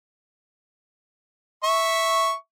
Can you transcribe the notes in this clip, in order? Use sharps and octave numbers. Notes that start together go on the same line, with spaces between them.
E5 C#6